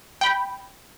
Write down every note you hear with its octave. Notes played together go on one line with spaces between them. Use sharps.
G5 B5